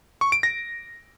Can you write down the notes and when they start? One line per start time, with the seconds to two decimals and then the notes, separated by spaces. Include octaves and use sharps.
0.21 C#6
0.32 D7
0.43 A#6